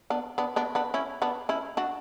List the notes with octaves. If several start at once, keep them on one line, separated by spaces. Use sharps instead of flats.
B3 D4
B3 D4
B3 D4
B3 D4
C#4 E4
B3 D4
C#4 E4
D4 F#4